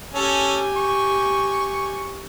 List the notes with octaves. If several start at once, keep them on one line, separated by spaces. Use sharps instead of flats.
C#4 G4 A4 G#5
C#6